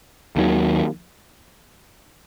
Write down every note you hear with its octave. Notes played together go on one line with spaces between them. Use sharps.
D#2 D#3 F#3